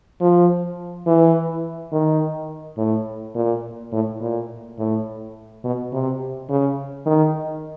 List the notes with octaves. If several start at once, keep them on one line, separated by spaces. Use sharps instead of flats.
F3
E3
D#3
A2
A#2
A2
A#2
A2
B2
C3
C#3
D#3